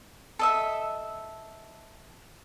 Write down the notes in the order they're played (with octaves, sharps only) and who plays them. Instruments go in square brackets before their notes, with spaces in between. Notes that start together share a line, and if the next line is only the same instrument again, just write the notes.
[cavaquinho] A4 D#5 E5